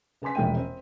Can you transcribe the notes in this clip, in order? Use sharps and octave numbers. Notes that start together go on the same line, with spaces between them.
C#3 B4 G#5 C6 B6
E1 A#1 G#3 E5 G5 D#7
C4 C5